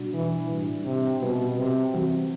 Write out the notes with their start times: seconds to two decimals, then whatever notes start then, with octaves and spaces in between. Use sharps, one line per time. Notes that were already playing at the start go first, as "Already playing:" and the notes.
Already playing: B2 G3 D4 F#4
0.14 E3
0.50 A2 G3 D4
0.85 C3
1.21 B2 G3 C4 F#4 B4
1.57 C3
1.94 E3 G3 C4 F#4